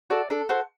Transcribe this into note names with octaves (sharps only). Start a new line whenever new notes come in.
F#4 A4 D5
D4 A4
F#4 A4 C5